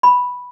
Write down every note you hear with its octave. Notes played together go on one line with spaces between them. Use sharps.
B5